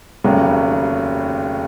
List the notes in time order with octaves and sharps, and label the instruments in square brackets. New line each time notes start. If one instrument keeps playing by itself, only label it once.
[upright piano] F1 D#2 C#3 F#3